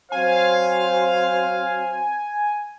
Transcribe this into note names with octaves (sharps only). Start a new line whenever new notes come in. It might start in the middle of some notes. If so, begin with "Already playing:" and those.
F#3 C4 C5 F5 G#5